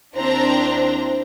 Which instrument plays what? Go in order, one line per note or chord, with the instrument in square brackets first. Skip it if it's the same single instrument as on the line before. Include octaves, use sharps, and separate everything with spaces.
[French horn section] D#2 E4 C5 [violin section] C4 D4 A#5